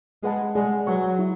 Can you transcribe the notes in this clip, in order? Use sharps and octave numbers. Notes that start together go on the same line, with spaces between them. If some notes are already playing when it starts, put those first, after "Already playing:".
G#3 G#4 B4 F#5 A5
G#3 G#4 D5 F#5
F#3 G#4 B4 F#5 C#6
E4